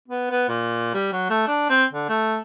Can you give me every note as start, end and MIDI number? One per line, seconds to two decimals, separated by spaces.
0.08 0.28 59
0.31 0.45 59
0.49 0.92 46
0.94 1.09 55
1.13 1.28 54
1.30 1.43 57
1.48 1.68 62
1.70 1.84 60
1.93 2.08 50
2.09 2.38 57